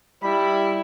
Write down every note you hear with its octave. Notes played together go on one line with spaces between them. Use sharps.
G3 E4 B5